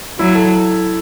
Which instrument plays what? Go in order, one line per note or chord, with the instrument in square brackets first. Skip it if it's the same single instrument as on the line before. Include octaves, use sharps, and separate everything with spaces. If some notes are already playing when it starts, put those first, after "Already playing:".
[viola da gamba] F#3 [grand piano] E4
[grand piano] A4